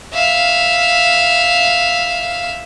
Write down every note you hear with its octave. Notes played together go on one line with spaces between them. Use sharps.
E5 F5